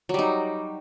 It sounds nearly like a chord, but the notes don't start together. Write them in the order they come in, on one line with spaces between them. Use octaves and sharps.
F#3 G3 D#4